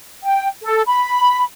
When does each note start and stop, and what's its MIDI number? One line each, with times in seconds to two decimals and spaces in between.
0.23 0.48 79
0.63 0.81 69
0.87 1.43 83